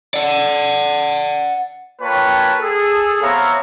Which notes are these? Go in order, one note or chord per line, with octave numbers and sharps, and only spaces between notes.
D5 F#5
A#3 F4 B4 C#5 G5 A5
G#4 A4
B3 C4 C#5 E5 F5 A#5